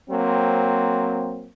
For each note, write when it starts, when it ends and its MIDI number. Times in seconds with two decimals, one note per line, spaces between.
0.10 1.50 54
0.10 1.50 58
0.10 1.50 60